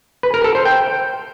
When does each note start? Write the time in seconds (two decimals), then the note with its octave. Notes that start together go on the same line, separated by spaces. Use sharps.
0.23 B4
0.34 A#4
0.44 A4
0.55 C5
0.65 G5